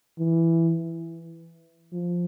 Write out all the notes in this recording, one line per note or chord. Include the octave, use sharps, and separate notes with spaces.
E3
F3